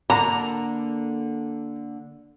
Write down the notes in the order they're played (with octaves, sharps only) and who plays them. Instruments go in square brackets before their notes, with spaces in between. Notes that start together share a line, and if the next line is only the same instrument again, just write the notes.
[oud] D3 A#3 A4 [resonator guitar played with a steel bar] A#5